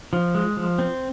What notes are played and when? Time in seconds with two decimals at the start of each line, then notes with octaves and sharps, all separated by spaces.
0.13 F3
0.35 G#3
0.57 F3
0.79 C4